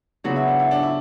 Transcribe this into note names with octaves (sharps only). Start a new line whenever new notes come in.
C#3 F#3 B3 D4 F#4
E4
D4
E4
D4
E4